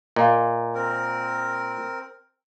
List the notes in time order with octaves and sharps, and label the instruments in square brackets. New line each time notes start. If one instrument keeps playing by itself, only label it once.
[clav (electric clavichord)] A#2 [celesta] D#5 F5
[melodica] C4 A#4